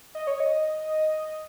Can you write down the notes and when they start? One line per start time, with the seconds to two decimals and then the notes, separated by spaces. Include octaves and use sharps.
0.15 D#5
0.27 C#5
0.40 D#5